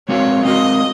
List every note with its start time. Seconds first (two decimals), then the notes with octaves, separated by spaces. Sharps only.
0.09 G#3 C4 F#4 A#4 C#5 F5
0.45 G#3 C4 F#4 A#4 D#5 F5